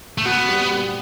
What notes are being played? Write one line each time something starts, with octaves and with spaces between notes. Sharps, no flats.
A3
B3 F#4
G3
G3